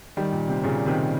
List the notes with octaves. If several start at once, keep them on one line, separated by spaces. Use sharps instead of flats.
D#3 G3
A#2
C3
A#2 C#3
C3 D#3